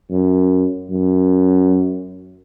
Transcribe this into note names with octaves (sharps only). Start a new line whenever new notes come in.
F#2
F#2